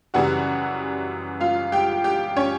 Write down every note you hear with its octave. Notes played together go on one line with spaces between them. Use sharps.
F#2 C#3 E3 G3 F#4 F#5
F4 F5
G4 G5
G4 G5
C#4 C#5